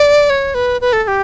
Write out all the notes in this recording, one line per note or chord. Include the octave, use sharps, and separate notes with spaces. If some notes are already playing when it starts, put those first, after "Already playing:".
Already playing: D5
C#5
B4
B4
A4
A4
G4